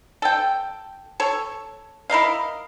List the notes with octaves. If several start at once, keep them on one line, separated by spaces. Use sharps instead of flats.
A4 G5
A4 C#5
E4 A#4 D#5 F5